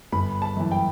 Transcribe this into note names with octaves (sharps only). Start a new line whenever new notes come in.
G1 B5
A5
F#2 E3
G5